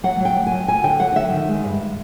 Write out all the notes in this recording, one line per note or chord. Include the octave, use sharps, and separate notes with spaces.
F#3 F#5
F#3 G5
D2
G#5
D2
D2 G#5
D3 G5
F#3 F#5
D3 E5
D#3
G#3
G2